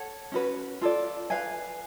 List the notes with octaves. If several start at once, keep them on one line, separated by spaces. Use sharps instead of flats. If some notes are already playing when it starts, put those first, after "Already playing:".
Already playing: A4 C#5 F#5
C#4 F#4 B4
F4 A4 D5
B4 F5 G#5